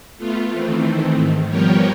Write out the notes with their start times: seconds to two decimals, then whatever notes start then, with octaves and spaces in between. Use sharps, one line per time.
0.18 A3 B3 F4
0.51 D#3 E3 A3 C4
1.14 G#2 D#3
1.49 F3 G3 B3 G4 A#4 C#5